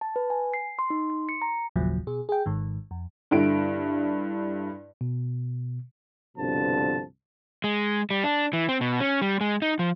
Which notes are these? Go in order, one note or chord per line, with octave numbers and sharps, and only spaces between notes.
A5
B4
G#5
C7
C6
D#4
C6
C#7
A#5
G1 D#2 A#2 C#3 F3 F#3
B2 G#4
G#4 G5
G#1 G#2 D#3
F2
G2 D3 E4 D7
B2
C2 G2 B2 D3 F3 A5
G#3
G3
D4
E3
C4
B2
C#4
G3
G#3
D#4
F3